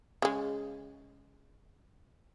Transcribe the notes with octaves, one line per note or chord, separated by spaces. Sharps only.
C#3 G#3